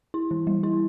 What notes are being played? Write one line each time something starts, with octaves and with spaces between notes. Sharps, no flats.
E4
E3
G3
E4